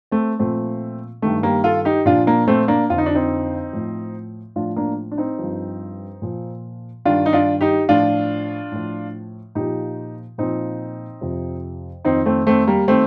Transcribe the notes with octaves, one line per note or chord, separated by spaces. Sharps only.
A3 C4
A#2 F3 A3 C4
G2 D#3 A3
G3 A#3
F4 A4
D#4 G4
A#2 F3 D4 F4
A#3 D4
A3 C4
A#3 D4
F2 D3 F3 F4
D#4
D4
C4 D#4
A2 F3
A2 F3 D4 F4
A#3 D4
D4
C4 D#4
G2 F3
A#2 F3
G2 D#3 D4 F4
D#4
D4 F4
D#4 G4
A2 F3 D4 F4
A2 F3
A#2 F3 D#4 G4
A#2 F3 C4 D#4
F2 C3 F3
F2 D#3 C4 D#4
A3 C4
A3 C4
G3 A#3
D#3 A3 C4